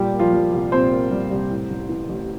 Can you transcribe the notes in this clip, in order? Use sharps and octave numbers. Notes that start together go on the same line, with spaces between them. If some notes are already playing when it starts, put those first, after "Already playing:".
Already playing: A#2 G3 G4
A#3
F3 F4
G3
C2
A#2 C4 C5
A#3
G3
C2
A2
A1
E3
A1